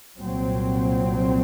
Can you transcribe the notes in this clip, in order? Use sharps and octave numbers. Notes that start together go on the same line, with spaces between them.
C2 A#2 F#3 C4